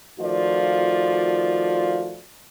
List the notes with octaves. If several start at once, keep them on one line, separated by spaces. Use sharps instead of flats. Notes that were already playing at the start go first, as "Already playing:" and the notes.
D#3 F3 A3 F4 F#4 D5